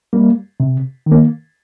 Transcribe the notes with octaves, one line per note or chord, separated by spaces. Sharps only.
G3 A#3
C3
D#3 A#3